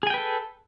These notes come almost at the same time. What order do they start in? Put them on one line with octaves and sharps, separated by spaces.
G#4 G#5 G5 B4 A4